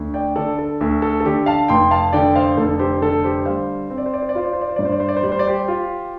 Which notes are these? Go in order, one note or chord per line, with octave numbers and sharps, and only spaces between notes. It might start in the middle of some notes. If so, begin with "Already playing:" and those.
Already playing: D2
D5 G5
D3 A4 D5
A4
D2 A4
A4
A4
D3 G4
F5 A5
F1 G5 C6
F5 A5
D3 D5 G5
C5 F5
F1 A4
G4 C5
D3 A4
G4 C5
G3 C5 F5
C4 C5
D5
C5
D5
C5
D5
F4 C5
D5
C5
D5
C5
G2 D5
C5
D5
C5
D5
C5
G3 D5
C5
D5
G4 C5
F4